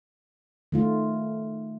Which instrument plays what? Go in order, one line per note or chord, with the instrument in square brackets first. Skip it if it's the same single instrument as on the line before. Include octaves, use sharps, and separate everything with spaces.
[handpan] D#3 A3 F4